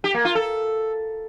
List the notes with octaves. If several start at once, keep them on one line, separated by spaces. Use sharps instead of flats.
G4
A#3
F4
A4